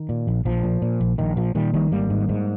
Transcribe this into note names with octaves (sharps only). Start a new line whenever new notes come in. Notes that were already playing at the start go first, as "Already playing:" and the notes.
Already playing: D#3
A#2
A#1
A#1 F3
A#2
A#2
A#1
A#1 D#3
A#2 F3
A#2 D#3 G3
A#1 D#3 G3
G#1 G3 A#3
G#2
G#2